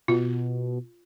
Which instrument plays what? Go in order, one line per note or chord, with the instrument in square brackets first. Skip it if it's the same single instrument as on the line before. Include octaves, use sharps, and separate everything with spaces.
[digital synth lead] B2 [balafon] F4